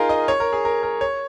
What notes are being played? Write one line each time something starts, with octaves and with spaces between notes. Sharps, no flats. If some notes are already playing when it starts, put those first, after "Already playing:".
Already playing: D#4 F4 G#4 A#4
D#5
C#5
A#4
G#4
A#4
A#4
C#5